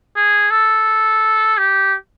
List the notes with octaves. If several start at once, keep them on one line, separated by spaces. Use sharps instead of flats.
G#4
A4
G4